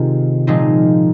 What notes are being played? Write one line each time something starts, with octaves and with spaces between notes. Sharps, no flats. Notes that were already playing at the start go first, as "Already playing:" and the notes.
Already playing: C3 D#3 G#3 C4 F4
A#2 F3 G#3 C4 D#4